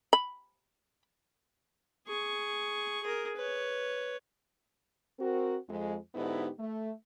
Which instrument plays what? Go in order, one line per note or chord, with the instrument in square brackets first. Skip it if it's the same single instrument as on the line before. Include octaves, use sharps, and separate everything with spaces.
[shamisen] B5
[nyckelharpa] G#4 C#6
G#4 A#4
B4 C#5
[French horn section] C4 F#4 A#4
F2 G#3
G#2 D3 B3 D#4 E4 G4
A3